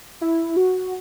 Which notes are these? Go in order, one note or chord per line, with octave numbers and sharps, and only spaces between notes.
E4
F#4